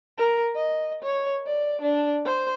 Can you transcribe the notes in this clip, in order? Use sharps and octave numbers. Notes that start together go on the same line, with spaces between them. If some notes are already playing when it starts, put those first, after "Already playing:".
A#4
D#5
C#5
D5
D4
C5